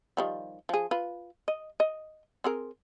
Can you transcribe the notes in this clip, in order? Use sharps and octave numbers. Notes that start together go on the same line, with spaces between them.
D#3 F3 G3
F3 G#4
F4 B4
D#5
D#5
C4 G#4 A#4